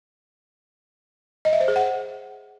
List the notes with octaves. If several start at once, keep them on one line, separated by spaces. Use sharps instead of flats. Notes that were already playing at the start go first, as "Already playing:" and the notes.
D#5
E5
C5
G#4
F#5